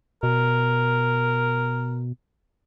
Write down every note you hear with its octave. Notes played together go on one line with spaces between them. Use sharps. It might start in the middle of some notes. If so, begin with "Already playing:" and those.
B2 A#4